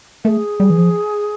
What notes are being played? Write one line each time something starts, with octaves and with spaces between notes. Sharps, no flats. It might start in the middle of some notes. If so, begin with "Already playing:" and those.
A3 G#4 A#4
G3
E3
F3